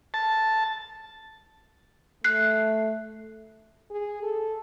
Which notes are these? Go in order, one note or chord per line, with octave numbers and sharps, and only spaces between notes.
A5
A3 F#6 C7
G#4
A4